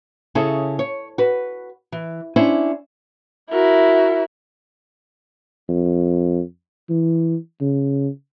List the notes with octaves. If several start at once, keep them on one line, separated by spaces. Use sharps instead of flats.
C#3 C#4 E4 G#4 A4
C#5
F#4 B4
E3
C#4 D4 E4 C5
E4 F#4 A#4
F2
E3
C#3